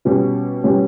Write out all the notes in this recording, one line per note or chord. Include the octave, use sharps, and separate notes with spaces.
B2 G3 C#4 G4 C#5
B2 G3 C#4 G4 C#5